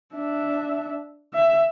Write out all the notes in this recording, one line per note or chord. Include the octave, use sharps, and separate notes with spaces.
D4 E5
E5